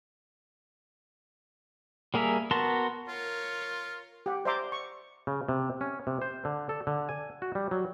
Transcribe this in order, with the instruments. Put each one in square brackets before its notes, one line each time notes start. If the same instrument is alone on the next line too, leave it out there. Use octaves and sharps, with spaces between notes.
[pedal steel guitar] G3 A#3 G#4 A#4 E5
B3 F#4 A#4 A5 C6
[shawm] F4 [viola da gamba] A#4 C#5
[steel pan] G4 F#5
C5 D5 E5 A#5 C6 D6
C#6
[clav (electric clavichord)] C#3
C3
C#4
C3
C5
D3
A4
D3
G#5
F#4
G3
F#3